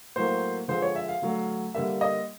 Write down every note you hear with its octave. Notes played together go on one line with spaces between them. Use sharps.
A2 F#3 A#3 C5
D3 F3 G#3 C5
C#5
E5
F5
D3 F#3 A3
D3 G3 A#3 E5
D#5